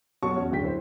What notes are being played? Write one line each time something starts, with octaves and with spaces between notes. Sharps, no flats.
B1 F#4 C#5 A5 C#6
E2 C#4 F#4 C#5
D1 G2 D4 G5 B6
E4 C5